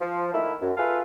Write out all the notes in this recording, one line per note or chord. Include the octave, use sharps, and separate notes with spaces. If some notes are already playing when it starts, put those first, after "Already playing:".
F3
D#3 A3 A#3 E4
F#2
F4 G#4 A4 B4 E5 F5